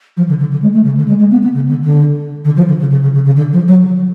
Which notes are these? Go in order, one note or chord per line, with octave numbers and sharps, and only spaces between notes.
F3
D3
D3
D3
G#3
A3
C#3
D3
G#3
G#3
B3
B3
C#3
D3
D3
D3
F3
D3
C#3
C#3
C#3
C#3
C#3
D3
F3
F#3